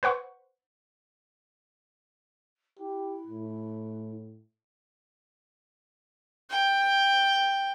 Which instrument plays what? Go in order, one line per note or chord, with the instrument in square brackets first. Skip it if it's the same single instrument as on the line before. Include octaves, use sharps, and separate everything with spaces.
[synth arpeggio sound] B4 C5 F#5 C#6
[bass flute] E4 [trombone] G4
[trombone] A2
[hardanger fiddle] G5